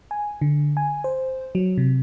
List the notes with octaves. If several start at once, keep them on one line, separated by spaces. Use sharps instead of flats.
G#5
D3
G#5
C5
F#3
C3